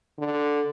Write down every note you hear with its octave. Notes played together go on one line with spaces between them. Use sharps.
D3